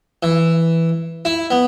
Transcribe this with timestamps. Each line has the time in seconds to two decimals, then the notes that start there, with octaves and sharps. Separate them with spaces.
0.23 E3
1.25 E4
1.51 B3